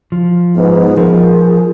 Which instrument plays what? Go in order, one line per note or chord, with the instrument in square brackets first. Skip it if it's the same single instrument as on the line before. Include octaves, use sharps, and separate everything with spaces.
[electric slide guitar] F3
[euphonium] G#2 [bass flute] B3
[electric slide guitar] F3 [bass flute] G#4 [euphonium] A#4